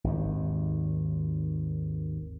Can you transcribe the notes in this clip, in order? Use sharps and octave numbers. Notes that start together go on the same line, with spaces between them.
G#1 D#2